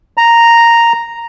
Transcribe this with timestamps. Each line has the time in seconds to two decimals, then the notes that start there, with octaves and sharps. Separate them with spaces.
0.17 A#5